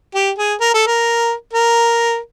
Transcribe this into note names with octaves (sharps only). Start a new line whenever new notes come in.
G4
G#4
A#4
A4
A#4
A#4